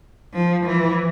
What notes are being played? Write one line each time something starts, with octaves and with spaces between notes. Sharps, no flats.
F3
E3